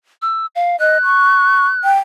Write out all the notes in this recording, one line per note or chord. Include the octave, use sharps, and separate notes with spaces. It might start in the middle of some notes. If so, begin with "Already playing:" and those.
E6
F5
D#5 F#6
C#6
G5